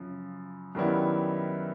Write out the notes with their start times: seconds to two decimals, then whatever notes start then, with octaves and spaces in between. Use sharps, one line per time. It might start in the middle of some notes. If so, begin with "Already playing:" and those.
Already playing: F#2 C#3 F3
0.75 F#2 D#3 G3 B3 E4